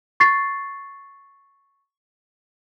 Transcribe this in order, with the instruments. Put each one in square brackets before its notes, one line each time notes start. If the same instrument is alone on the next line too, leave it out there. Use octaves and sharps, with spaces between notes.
[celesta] C#6 A6 C7